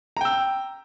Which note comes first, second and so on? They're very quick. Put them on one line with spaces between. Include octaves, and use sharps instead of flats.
A#5 G5 E6